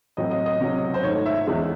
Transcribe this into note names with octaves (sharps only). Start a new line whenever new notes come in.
A1 A2 F#3 C4 D#5
D#5
D#5
C#2 C3 F#3 C#4
C5
G#2 D#3 A3 C#5
E5
E2 C#3 G#3 E5